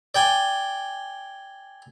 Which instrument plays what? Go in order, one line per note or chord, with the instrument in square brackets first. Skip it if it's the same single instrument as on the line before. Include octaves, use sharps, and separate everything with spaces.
[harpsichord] D5 G5 G#5